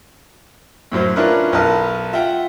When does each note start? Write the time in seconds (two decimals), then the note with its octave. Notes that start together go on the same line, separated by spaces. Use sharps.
0.92 F#2 A2 F#3 C5
1.16 C#4 D4 E4 F4 A#4 B4
1.52 B1 A#4 B4 D#5 A5 F6
2.13 F4 E5 F#5 G5